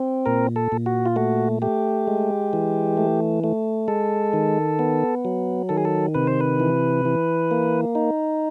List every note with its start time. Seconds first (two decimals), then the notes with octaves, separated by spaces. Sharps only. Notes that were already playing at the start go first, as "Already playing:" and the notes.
Already playing: C4
0.26 A#2 A#4
0.56 A4
0.72 A#2
0.86 F#4
1.06 F4
1.16 A3 F#4
1.62 A3 G4
2.07 G#3
2.53 E3
2.97 A3
3.44 A3
3.88 G#3 A4
4.33 D#3
4.79 B3
5.25 F#3
5.69 D#3 A4
5.77 G#4
5.85 A4
6.15 C3 B4
6.27 C5
6.40 B4
6.60 E3
7.05 E3
7.51 A#3
7.95 D#4